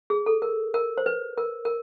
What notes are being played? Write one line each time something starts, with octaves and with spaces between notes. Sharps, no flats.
G#4
A4
A#4
A#4
C5
B4
A#4
A#4